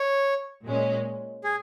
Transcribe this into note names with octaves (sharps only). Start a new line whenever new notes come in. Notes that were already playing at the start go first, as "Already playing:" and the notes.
Already playing: C#5
A#2 G#3 C#4
G#4